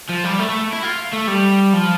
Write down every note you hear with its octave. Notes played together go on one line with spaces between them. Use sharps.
F3
G3
A3
A3
E4
F4
A3
G3
F3